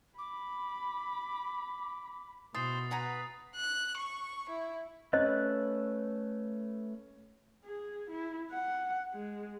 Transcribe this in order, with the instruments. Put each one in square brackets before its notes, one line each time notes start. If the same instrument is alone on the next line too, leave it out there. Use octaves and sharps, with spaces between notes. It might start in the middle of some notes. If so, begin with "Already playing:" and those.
[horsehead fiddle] B5 [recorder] D6
[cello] B2 [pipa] E3 [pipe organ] C5 [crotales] D#6 A6 C7
[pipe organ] B4 [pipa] F#5 G#5 A#5
[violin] F#6
C#6
E4
[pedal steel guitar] A3 B4 F#6 [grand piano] C#4 [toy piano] D#5
[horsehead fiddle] G#4
E4
F#5
G#3